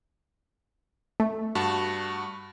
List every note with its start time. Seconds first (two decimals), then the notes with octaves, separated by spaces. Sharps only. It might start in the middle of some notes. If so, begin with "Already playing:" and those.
1.20 A3
1.55 G2 F#4 A5